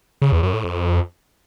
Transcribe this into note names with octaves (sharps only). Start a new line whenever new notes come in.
C#3
E2
F#2
A2
F2